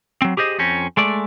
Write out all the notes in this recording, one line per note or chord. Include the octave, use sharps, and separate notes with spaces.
F#3 C4
G4 G#4 C5 D#5
F2 C4 C#4
G#3 A3 D5